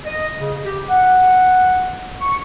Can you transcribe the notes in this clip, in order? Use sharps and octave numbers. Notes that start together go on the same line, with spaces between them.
D#5
C#3
G4
F#5
C#6